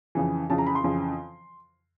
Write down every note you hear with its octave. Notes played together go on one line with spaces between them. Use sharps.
F2 C#3 E3
F2 C#3 E3 A5
A#5
B5
C6
F2 C#3 E3